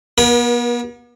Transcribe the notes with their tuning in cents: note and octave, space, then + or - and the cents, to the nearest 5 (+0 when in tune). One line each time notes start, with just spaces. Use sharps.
B3 -40 A#4 +40